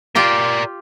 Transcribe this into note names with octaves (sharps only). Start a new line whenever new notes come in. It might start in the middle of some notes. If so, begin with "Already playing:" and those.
F4 G4 A#4 D5 G5